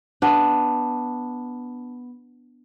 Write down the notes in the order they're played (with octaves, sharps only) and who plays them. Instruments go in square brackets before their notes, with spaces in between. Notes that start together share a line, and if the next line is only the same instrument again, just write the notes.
[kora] B3 D4